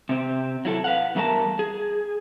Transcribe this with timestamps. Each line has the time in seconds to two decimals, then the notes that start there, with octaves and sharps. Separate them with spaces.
0.09 C3 C4
0.65 F#3 E4 A4
0.84 B4 F5 F#5
1.15 E2 G2 A3 D#4 A#4 A5
1.59 G#4